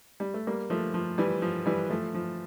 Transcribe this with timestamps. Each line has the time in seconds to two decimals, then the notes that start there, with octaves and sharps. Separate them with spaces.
0.20 G3
0.34 A3
0.47 G3 A#3
0.70 F3 A3
0.94 F3
1.18 E3 G3
1.42 F3
1.66 E3 G3
1.90 F3 A3
2.15 F3